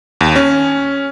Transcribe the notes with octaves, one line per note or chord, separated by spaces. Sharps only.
D#2
C#4